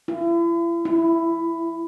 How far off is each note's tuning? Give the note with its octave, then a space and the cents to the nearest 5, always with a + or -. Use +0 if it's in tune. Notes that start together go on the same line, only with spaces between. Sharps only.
E4 +40
E4 +10